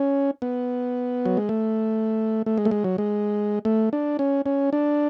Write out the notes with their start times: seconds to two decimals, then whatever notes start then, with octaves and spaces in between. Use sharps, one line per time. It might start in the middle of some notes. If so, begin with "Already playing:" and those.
Already playing: C#4
0.42 B3
1.26 F#3
1.37 G#3
1.49 A3
2.46 A3
2.58 G#3
2.65 A3
2.71 G#3
2.84 F#3
2.98 G#3
3.65 A3
3.93 D4
4.19 C#4
4.46 C#4
4.73 D4